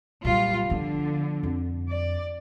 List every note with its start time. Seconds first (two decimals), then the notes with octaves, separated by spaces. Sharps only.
0.25 A#2 F#3 G3 F4
0.70 D3 F3 B3
1.43 F2
1.90 D5